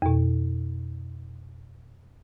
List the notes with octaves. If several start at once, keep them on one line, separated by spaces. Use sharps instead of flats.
F2 B2